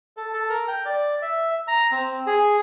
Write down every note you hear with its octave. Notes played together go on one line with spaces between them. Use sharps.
A4
A4
A#4
G5
D5
E5
A#5
C4
G#4